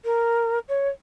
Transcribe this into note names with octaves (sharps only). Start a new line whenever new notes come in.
A#4
C#5